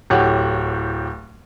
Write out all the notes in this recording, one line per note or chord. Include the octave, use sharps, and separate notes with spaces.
D1 A2 G4 C#5 F#5